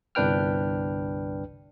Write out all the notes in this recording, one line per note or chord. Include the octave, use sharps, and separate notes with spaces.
G1 C2 D4 B4 G5 F6